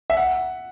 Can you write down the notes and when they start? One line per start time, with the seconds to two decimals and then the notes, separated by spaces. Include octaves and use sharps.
0.10 E5
0.17 F#5